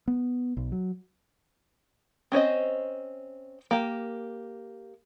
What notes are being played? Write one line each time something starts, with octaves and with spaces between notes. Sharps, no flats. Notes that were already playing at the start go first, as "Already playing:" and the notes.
B3
B1
F#3
C4 C#4 C5 D#5
A#3 G4